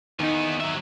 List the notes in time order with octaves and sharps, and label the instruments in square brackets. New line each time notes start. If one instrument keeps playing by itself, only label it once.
[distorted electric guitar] E2 B3 [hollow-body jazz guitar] D#3 D#4
[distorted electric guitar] F#3 E5